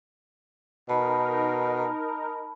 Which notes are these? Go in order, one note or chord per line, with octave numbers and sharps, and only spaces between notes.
B2 D#4 A#4 A5 B5